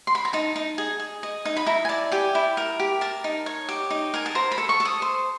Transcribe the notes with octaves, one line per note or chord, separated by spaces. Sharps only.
C6
B5
A#5
D#4 A5
D#4
G#4
G#4
D#5
D#4
B5
E4 A#5
G#5
D5 A5
G4 G#5
E4
A#4
G4
A#4 A5
D#4
C#5
G4
D#4
A#4 G#5
A5
C5 A#5
B5
A4
C#6
A4
D#6
C5